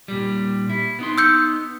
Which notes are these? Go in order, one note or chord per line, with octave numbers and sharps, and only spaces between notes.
A#2 G3
E4
B3 D#4 C6
E6 G6 C#7